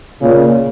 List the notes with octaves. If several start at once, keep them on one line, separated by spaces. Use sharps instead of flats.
A#2 C#3